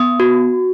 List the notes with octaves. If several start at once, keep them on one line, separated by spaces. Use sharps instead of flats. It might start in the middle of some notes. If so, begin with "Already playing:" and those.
Already playing: B3 D#6
F#4